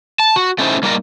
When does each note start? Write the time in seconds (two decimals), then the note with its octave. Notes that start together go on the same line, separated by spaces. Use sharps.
0.20 A5
0.36 F#4
0.59 A3 C#4 D#4 E4 C5
0.83 G3 A#3 D#4 A#4 D5 D#5